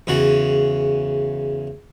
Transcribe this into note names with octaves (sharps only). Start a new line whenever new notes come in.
E2 C#3 F#4